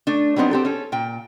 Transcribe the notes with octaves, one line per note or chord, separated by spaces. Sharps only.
A3 D4
F#3 G3 B3 C4 D#4
C4 G4 A4
C#4 A4
A#2 G5